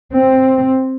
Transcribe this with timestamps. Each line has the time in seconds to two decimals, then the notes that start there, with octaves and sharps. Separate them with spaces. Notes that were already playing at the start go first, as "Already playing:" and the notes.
0.13 C4